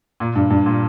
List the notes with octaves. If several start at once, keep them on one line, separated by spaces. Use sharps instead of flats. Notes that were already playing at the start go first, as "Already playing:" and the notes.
A#2
G2
G2
A#2